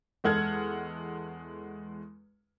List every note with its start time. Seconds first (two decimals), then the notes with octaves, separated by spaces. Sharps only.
0.24 E2 G#3 A4 F#5 F6 G#6